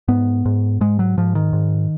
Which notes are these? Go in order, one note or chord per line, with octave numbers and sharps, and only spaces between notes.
G#2 B3
G#2
G#2 G#3
F#3
G#2 F3
D#3
G#2